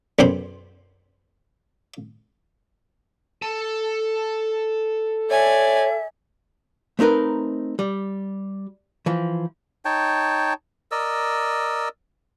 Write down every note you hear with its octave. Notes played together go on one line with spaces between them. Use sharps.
B1 F#2 C5 B5
A4 A5
C#5 D5 E5 G#5
A3 C4 D#4 A#4 B4
G3
E3 F3
D#4 C#5 G5 A5
A#4 D5 D#5 E6